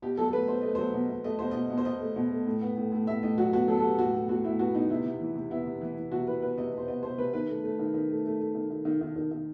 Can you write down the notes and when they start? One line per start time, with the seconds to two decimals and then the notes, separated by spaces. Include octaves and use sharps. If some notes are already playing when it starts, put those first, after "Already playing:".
0.02 B2 G4
0.17 F#3 A4
0.28 A4
0.33 A3 B4
0.48 B2 C5
0.61 A3 D#5
0.75 F#3 C5
0.94 B2
1.10 B2
1.24 A3 D#5
1.39 B2 C5
1.51 B2 D#5
1.70 B2
1.78 C5
1.85 B2 D#5
2.00 A3
2.16 B2
2.31 A3
2.46 A2
2.62 B3
2.77 A2
2.92 A2
3.07 A2 E5
3.23 A2 D#5
3.38 F#3 F#4
3.53 B3 F#4
3.68 F#3 A4
3.78 A4
3.83 B3 G4
3.99 A2 F#4
4.14 A2
4.29 A2 F#4
4.44 A2 E4
4.59 B3 F#4
4.75 B3 D#4
4.90 C3 E4
5.05 C3
5.21 E3
5.36 C3
5.50 B3 E4
5.66 C3
5.81 E3
5.97 E3
6.12 C3 F#4
6.27 E3 B4
6.42 B3 B4
6.57 C3 D#5
6.73 C3 C5
6.88 B3 D#5
7.03 B3 C5
7.18 C3 B4
7.33 D#3 B4
7.48 A3
7.64 A3
7.79 D#3
7.94 D#3
8.10 A3
8.25 A3
8.40 A3
8.55 D#3
8.70 D#3
8.85 D#3
9.01 D#3
9.16 D#3
9.31 D#3